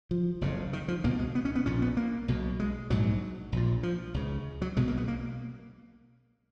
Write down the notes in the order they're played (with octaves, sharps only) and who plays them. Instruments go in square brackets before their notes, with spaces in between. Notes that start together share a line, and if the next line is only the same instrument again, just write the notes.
[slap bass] F3
F#1 F2 C#3
D#3
F3
C#2 B2 A#3
G#3
B3
C#4
B3
A#1 A#2 C#4
B3
A#3
B1 B2
G#3
A#1 G#2 F#3
A#1 A#2
F3
C#2 C#3
F#3
B1 B2 G#3
A#3
B3
A#3